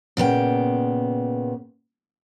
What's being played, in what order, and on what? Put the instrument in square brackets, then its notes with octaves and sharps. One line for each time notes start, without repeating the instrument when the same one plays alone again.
[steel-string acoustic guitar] A#2 C#3 B3 G5